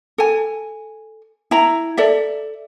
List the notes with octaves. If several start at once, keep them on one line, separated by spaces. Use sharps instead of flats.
A4 G#5
E4 A#5
A4 D5 E5